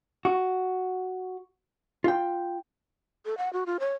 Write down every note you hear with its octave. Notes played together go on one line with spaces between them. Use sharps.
F#4
F4 G5
A4
F#5
F#4
F4
C#5